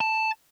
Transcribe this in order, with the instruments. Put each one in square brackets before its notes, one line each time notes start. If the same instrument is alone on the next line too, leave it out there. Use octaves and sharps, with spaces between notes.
[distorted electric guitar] A5